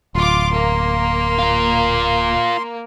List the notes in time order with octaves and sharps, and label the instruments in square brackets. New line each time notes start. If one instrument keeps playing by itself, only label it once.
[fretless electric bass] D1 [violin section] F4 D6 [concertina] C6
[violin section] A#3
[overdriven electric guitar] F4 A#4